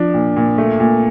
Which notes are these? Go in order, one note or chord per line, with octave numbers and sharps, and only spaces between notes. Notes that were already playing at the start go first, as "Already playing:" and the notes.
Already playing: F3 D4
A#2
A#2
A3
A#2